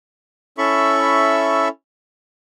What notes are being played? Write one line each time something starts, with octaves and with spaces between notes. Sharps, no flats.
C#4 E4 A4 E5 B5 C#6